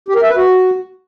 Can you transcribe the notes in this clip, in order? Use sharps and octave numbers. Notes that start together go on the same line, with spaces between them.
G4
A#4
E5
B4
F#4